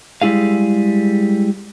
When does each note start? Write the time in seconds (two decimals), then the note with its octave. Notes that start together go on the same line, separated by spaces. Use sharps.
0.22 G3 G#3 E4 G#4 F5